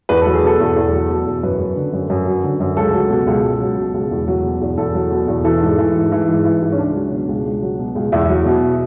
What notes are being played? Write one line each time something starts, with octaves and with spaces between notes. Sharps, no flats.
E2 B4
F#3 A4
G#4
B2 A4
E2
E2
F#3
B2
E2
F#2 B4
F#3
D3
F#2
F#2
F#3
D3
F#2
C#2 A4
F#3
B2
C#2
C#2
F#3
B2
C#2
E2
F#3
B2
E2
E2 A4
F#3
B2
E2
E3 A4
G#2
E3
G#2
E3
G#2
E3
G#2
C#4
C#2 D4
F#3
B2
C#2
C#2
F#3
B2
C#2
E2 E4
F#3
B2